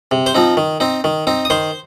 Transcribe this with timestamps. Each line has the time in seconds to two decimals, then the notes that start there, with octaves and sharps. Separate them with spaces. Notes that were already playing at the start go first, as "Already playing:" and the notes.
0.11 C3
0.26 C5 C6
0.35 F3 C4 D#4
0.57 D#3
0.80 C4 D#4
1.04 D#3
1.27 C4 D#4
1.45 D#6
1.50 D#3 C5 C6